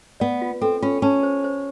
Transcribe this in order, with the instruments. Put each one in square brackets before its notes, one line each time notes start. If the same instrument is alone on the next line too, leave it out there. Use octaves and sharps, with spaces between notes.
[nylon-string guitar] B3 [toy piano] D5
[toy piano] F4
[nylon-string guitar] C4 [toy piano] A4
[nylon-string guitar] C#4 [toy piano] F4
[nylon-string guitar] C#4 [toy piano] A5
[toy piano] C5
C5